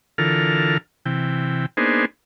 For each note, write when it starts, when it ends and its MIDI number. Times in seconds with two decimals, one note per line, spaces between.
0.18 0.77 50
0.18 0.77 52
0.18 0.77 65
0.18 0.77 69
0.18 0.77 70
0.18 0.77 89
1.06 1.66 48
1.06 1.66 52
1.06 1.66 79
1.77 2.05 58
1.77 2.05 59
1.77 2.05 62
1.77 2.05 63
1.77 2.05 68
1.77 2.05 72